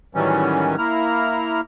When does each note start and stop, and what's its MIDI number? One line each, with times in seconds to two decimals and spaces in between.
0.15 0.76 45
0.15 0.76 51
0.15 0.76 52
0.15 0.76 54
0.15 0.76 55
0.15 0.76 61
0.78 1.60 58
0.78 1.60 64
0.78 1.60 82
0.78 1.60 89